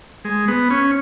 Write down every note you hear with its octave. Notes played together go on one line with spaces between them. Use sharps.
G#3
B3
C#4